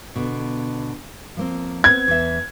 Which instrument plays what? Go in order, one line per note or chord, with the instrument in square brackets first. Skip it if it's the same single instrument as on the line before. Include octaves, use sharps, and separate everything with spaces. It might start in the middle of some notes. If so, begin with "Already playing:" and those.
[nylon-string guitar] B2 D3
F3 A#3 C4
[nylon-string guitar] B3 C4 [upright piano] G#6
[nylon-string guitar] E2 E5